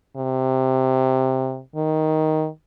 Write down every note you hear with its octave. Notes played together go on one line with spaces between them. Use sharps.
C3
D#3